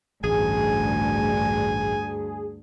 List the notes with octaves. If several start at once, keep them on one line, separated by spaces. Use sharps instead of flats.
A1 D2 G2 G#4 G#5